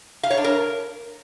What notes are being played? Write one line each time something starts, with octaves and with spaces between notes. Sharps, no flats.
F5
C#5
D4
A#4